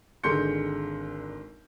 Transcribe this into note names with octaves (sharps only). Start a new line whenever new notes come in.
G#1 D3 G#3 C6 G6 C#7